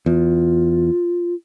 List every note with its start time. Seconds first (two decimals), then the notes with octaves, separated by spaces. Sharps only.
0.06 E2 F4